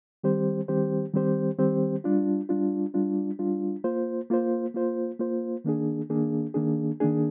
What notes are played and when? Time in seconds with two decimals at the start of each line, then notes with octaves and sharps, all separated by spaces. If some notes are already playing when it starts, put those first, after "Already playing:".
0.24 D#3 G3 C4 G4 C5
0.68 D#3 G3 C4 G4 C5
1.13 D#3 G3 C4 G4 C5
1.59 D#3 G3 C4 G4 C5
2.04 G3 D4 F4
2.49 G3 D4 F4
2.94 G3 D4 F4
3.39 G3 D4 F4
3.84 A#3 F4 C5
4.30 A#3 F4 C5
4.74 A#3 F4 C5
5.19 A#3 F4 C5
5.64 D#3 A#3 D4 G#4
6.09 D#3 A#3 D4 G#4
6.54 D#3 A#3 D4 G#4
7.00 D#3 A#3 D4 G#4